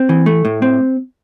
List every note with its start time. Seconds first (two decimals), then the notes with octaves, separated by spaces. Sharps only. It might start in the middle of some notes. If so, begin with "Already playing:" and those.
Already playing: C4
0.09 E3
0.26 A3
0.45 A2
0.62 C4